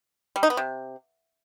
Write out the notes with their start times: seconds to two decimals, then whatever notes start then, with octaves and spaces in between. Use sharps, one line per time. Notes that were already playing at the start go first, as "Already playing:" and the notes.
0.36 G3
0.43 D#4
0.50 B3
0.57 C3